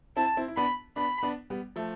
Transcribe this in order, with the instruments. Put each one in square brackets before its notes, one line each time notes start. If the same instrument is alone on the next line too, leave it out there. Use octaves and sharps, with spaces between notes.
[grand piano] C4 E4 [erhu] A5
[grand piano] C4 E4
E4
[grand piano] B3 D4 [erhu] B5
[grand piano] B3 D4 [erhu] B5
[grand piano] B3 D4
G3 B3
F3 A3